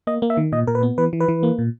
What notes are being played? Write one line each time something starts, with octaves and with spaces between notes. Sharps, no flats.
A#3 D#5
A#3
E5
D#3
A#2 D#5
A#2 A#4
B4
B3
E3 B4
E3
B4
E3
A#3
A#2